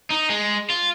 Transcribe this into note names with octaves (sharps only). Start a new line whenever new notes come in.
D#4
G#3
F4